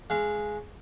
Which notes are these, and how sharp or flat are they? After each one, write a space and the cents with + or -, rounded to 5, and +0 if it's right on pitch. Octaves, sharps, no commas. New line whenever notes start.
G#3 +10 F5 -30 C#6 +0